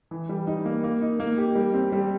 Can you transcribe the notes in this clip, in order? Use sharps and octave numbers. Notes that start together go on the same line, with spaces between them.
E3
G3
D#4
A#3
A#3
D#4
A#3
G4
G3
C4
G3